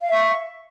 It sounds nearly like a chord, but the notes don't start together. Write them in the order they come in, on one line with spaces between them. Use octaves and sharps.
F5 E5 C#6